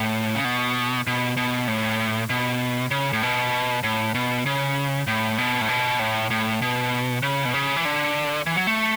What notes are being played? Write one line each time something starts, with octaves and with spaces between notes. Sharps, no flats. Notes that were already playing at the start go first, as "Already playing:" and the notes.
Already playing: A2
C#3
B2
B2
B2
A2
B2
C#3
A2
B2
A2
B2
C#3
A2
B2
A2
B2
A2
A2
B2
C#3
B2
C#3
E3
D3
E3
F#3
A3